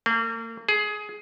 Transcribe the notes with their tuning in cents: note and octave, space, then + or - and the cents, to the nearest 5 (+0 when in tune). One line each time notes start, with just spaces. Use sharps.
A#3 -40
G#4 +15